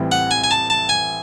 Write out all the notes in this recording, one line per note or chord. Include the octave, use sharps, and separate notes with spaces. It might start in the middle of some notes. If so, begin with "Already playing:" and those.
Already playing: A1 A2 E3 G3 C4
F#5
G#5
G#5
A5
A5
G#5